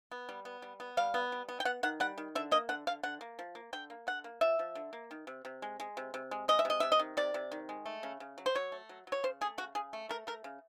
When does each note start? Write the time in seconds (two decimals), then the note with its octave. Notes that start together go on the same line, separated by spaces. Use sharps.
0.11 B3
0.29 G3
0.45 B3
0.62 G3
0.80 B3
0.97 G3 F5
1.14 B3
1.32 G3
1.49 B3
1.60 G5
1.65 B3 F#5
1.83 D#3 F#5
2.00 G3 F#5
2.18 D#3
2.35 D3 E5
2.51 A#3 D#5
2.69 D3 F#5
2.87 D3 F5
3.03 D3 F#5
3.21 A#3
3.39 F3
3.55 A#3
3.73 D3 G5
3.90 A#3
4.07 D3 F#5
4.24 A#3
4.41 F3 E5
4.59 F3
4.75 D3
4.93 A#3
5.11 D#3
5.27 C3
5.45 C3
5.62 G#3
5.80 G#3
5.97 C3
6.14 C3
6.31 G#3
6.48 G#3 D#5
6.59 E5
6.65 C3 D#5
6.80 C3 E5
6.92 D#5
6.99 D#3
7.17 C3 D5
7.34 C3
7.52 D#3
7.69 G#3
7.86 A3
8.03 C#3
8.20 C#3
8.38 F#3
8.46 C5
8.55 F#3 C#5
8.72 A3
8.89 F#3
9.07 F#3
9.12 C#5
9.23 C#3 C5
9.41 A3 G#4
9.58 C#3 F#4
9.75 C#3 G#4
9.93 A3
10.09 A3 A#4
10.27 A3 A#4
10.44 C#3